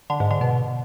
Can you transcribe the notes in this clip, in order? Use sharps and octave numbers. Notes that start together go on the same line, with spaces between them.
D3
G#2
D3
B2